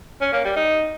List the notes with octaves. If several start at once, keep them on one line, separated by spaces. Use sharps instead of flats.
C#4
A#3
G3
D#4